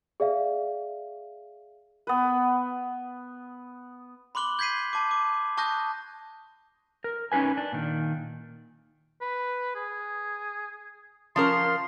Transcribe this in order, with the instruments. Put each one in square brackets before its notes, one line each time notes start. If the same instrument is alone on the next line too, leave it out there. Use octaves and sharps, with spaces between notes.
[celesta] G#4 D5 E5 F5
[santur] B3 B4
[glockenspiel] B5 C6 D6 F#6 F#7 G7
G6 G#6 B6 C7 D#7
A5 D6
D6
A5 C#6 D#6 F#6 G6 A#6
[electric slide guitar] A#4
C#4 D#4 F4 B4 G#5
D4
A#2 D#3
[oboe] B4
G#4
[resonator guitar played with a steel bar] F3 C#4 A#4 [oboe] C6